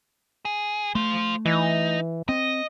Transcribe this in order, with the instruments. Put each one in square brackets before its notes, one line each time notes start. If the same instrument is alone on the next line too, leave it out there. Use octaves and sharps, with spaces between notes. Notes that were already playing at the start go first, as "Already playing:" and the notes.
[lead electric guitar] G#4
[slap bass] A3 [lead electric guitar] F4 C5
[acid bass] E3 [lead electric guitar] D#4
[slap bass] C4 [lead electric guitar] D#5